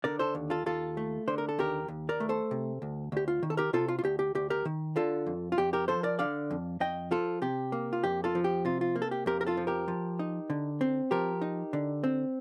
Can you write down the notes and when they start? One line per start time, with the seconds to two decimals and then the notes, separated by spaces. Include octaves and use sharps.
0.04 D3 A#4 D5
0.19 A4 C5
0.35 D#2
0.50 F4 A4
0.66 D#2 F4 A4
0.97 A3
1.28 D3 C5
1.38 A#4
1.49 A4
1.59 D#2 G4 A#4
1.88 D#2
2.09 A#4 D5
2.20 A3
2.29 A4 C5
2.51 C3
2.82 D2
3.12 D2 G4
3.28 F4
3.43 D#3
3.50 A4
3.57 G4 A#4
3.73 C3 F4 A4
3.88 F4
3.99 F4
4.03 D2 G4
4.19 G4
4.35 D2 G4
4.50 G4 A#4
4.65 D#3
4.96 D3 F4 A4
5.26 F2
5.52 F4
5.58 F2 G4
5.73 G4 A#4
5.88 F3 A4 C5
6.03 A#4 D5
6.19 D3 D5 F5
6.51 F2
6.80 F2 D#5 G5
7.11 F3 F4 A4
7.42 C3 G4
7.72 A#3
7.93 F4
8.04 F2 G4
8.24 F4 A4
8.35 F3
8.44 G4
8.65 C3 F4
8.81 F4
8.96 A#3
9.02 A4
9.11 G4
9.26 F2 G4 A#4
9.41 A#4
9.46 F4 A4
9.57 F3
9.67 G4 A#4
9.88 F3
10.19 D#4
10.50 D3
10.81 C4
11.11 F3 G4 A#4
11.41 D#4
11.73 D3
12.04 C4